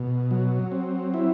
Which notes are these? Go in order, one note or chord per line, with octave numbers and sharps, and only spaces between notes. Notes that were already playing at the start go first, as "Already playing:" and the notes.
Already playing: B2
F#3
C4
E4